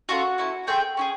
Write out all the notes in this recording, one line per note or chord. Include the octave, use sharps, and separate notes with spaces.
C#4 F4 F#4 A4 F#5
C#4 E4 A4
A3 C4 G#4 G5
C#4 E4 G#4